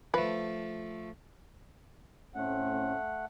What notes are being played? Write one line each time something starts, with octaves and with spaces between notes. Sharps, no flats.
F3 A3 B4
A2 A3 C4 C#4 F#5